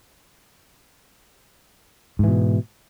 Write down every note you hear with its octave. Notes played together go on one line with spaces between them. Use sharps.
G#2 B2 E3